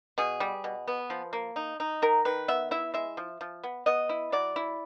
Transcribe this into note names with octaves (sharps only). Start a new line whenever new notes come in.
B2 G#4
G3
B2
B3
F3
A#3
D#4
D#4
D#3 A#4
D#3 B4
B3 E5
E4 E5
G#3 E5
F3
F3
B3
B3 D#5
E4
F#3 D5
E4